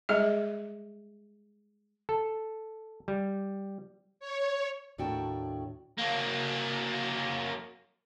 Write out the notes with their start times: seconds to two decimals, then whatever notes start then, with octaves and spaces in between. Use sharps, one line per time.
0.09 G3 G#3 G#4 D#5
2.09 A4
3.08 G3
4.20 C#5
4.98 D#2 A2 D4 F#4 G5 A5
5.98 F#3 A#3